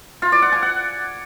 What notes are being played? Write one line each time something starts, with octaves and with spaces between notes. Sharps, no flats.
F4
D5
F#5
G#5
F#5